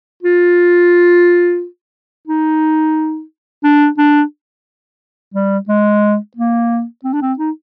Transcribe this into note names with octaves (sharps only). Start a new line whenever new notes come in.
F4
D#4
D4
D4
G3
G#3
A#3
C4
D4
C4
D#4